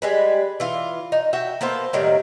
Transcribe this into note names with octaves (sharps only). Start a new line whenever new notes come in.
G3 G#3 B4
E3 F4
D#4
F#4 E5 G5
A#3 B3 A4 C5
A2 D#3 F#3 G3